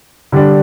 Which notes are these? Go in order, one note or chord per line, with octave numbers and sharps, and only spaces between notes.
D3 G3 D4